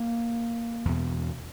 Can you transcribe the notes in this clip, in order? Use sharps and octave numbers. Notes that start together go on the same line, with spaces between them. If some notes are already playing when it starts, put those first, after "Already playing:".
Already playing: A#3
E2 B2